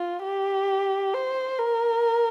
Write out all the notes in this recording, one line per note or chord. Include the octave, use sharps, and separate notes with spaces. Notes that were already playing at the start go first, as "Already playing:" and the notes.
Already playing: F4
G4
C5
A#4